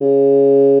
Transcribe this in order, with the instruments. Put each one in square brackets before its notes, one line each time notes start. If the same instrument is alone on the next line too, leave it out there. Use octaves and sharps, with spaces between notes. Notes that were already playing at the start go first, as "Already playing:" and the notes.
[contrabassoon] C#3